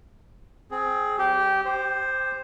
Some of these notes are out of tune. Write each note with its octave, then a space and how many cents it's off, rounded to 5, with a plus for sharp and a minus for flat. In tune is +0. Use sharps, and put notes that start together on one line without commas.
C4 +0 G#4 +15
G3 -40 G4 -15
G4 +20 C5 +0